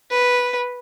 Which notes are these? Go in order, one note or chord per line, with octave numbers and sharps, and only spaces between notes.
B4